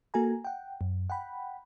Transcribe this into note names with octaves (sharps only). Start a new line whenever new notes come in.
A#3 F#4 A4 G#5 A#5
F#5 G5
F#2
F#5 G5 B5